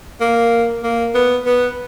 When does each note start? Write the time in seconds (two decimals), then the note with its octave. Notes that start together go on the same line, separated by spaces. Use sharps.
0.21 A#3
0.83 A#3
1.15 B3
1.46 B3